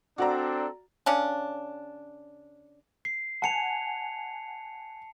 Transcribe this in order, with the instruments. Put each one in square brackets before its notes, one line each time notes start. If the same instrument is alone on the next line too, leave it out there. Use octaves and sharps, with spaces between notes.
[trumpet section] C4 D4 A4 [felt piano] F#4 D5 A#5
[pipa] C#3 C#4 D4
[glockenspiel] C7
[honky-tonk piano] F#5 G#5 [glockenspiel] A5 C#7 F7